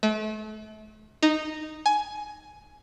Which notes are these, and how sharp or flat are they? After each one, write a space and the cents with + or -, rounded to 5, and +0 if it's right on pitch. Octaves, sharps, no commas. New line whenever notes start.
A3 -35
D#4 -5
G#5 +15